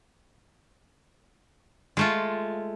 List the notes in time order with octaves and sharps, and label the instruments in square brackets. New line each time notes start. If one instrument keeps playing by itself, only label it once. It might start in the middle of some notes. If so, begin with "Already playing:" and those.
[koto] G#3 A3 F4